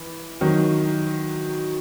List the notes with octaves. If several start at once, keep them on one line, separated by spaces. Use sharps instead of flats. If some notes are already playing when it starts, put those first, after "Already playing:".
Already playing: E3
D#3 F#3